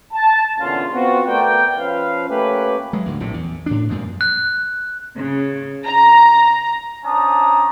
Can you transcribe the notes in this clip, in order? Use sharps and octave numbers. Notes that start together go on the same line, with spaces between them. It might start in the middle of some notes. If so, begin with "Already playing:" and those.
A5
E2 A#2 D3 C#4 F4
B3 C4 F4 F#4
A3 B3 A#4 D5 G5
F3 C#4 B4 F5
A3 A#3 C#4 G4 B4
F#3 G#3
D2 G#2
A#1 A2 C3
E2
A2 D4
F#2 A#2 F3 G#3
F#6
C#3
A#5
C#4 D4 C5 A5 A#5 D#6